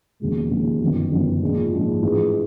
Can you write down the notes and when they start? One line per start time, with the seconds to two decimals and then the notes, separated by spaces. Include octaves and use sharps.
0.20 E1 D#2 C#3 F3 G#3
0.50 E1 D#2 C#3 F3 G#3
0.81 G1 F#2 D#3
1.12 G1 F#2 D#3
1.41 A#1 G#2 F3 G#3
1.73 A#1 G#2 F3 G#3
2.02 A1 G#2 F3 G#3